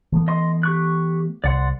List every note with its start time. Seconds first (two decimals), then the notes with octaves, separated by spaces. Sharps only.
0.12 E3 A3 B3
0.28 D#5 C6
0.63 G4 C#6 F#6
1.44 C2 D5 F#5 C6